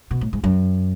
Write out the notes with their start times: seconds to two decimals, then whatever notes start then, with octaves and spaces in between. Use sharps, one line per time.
0.11 B2
0.21 A2
0.33 G#2
0.44 F#2